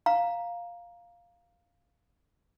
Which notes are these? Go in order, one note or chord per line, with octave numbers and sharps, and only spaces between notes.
F5 A#5